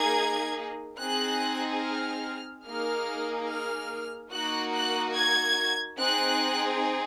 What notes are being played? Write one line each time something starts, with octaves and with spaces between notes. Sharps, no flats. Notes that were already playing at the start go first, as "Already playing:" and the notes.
Already playing: A#3 D#4 G#4 G#6
C4 D#4 G#4 F#6
F6
A#3 D#4 G#4 F6
F6
A#3 D#4 F#4 F#6
F#6
G#6
C4 D#4 G#4 F#6